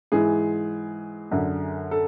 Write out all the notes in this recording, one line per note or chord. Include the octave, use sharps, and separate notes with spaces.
G#2 E3 G#4
F#2 D3
A4